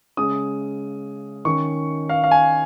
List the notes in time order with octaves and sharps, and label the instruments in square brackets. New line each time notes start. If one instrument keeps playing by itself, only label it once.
[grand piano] C#3 G#3 C#4 D#6
D#3 C#4 C#6
F5
F5
G#5